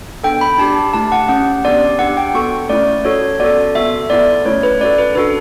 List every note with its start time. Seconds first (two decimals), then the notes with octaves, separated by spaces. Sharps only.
0.24 B3 D4 A4 G5
0.41 B5
0.58 D4 G4 A5
0.93 A3 E4 G4 A5
1.12 F#5
1.29 C#4 G4 F#5
1.65 B3 D4 G4 D5
1.99 D4 G4 F#5
2.17 G5
2.34 B3 F#4 A4 C#6
2.69 A3 C#4 E4 D5
3.05 C#4 F#4 A4 C#5
3.40 B3 F#4 A4 D5
3.75 B3 F#4 A4 E5
4.10 B3 E4 A4 D5
4.45 A3 C#4 E4 C#5
4.63 B4
4.81 C#4 F#4 A4 D5
4.98 B4
5.15 D4 F#4 A4 B4